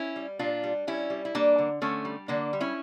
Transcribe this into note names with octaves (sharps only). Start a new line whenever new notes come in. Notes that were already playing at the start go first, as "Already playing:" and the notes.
Already playing: C#4 E4
G3
A#2 D4 F4
G3
G3 C#4 E4
G3
E4
G3 A#3 D4
D3
D3 A3 C#4
G3
D3 A#3 D4
G3
C#4 E4